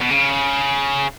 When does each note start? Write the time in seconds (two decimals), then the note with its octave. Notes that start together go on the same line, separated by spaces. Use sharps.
0.01 B2
0.10 C#3